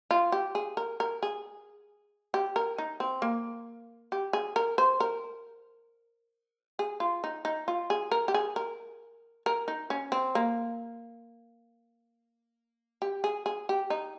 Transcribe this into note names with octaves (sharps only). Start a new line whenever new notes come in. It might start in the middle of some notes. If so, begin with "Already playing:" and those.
F4
G4
G#4
A#4
A#4
G#4
G4
A#4
D#4
C4
A#3
G4
G#4
A#4
C5
A#4
G#4
F4
D#4
D#4
F4
G#4
A#4
G4
G#4
A#4
A#4
D#4
C#4
C4
A#3
G4
G#4
G#4
G4
D#4